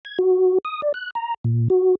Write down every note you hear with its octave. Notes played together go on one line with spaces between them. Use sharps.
G#6
F#4
D#6
D5
F#6
A#5
A#2
F#4